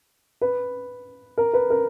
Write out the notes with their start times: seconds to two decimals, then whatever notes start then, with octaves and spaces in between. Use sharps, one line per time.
0.41 B4
1.38 A#4
1.54 B4
1.70 A#4